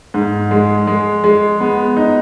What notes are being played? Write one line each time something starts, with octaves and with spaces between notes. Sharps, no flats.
G#2
G#3
G#3
G#3
B3
D#4